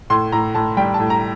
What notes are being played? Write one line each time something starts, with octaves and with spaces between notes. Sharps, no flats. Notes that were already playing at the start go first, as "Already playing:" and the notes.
A2 C6
A2 A#5
A2 A5
G3 G5
A5
A2
A#5